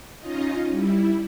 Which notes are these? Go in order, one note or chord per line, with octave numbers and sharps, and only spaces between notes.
C#4 D#4 F4 D#5
G3 E4